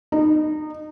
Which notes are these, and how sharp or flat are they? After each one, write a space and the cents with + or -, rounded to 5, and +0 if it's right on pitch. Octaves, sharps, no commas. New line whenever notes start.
D#4 -25